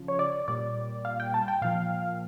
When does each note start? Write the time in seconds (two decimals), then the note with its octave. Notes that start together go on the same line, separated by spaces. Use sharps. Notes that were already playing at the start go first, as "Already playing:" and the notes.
Already playing: C#3 F3
0.08 C#5
0.19 D5
0.48 A#2 G3 D5
1.05 F5
1.20 G5
1.34 A5
1.48 G5
1.62 A#2 F3 F5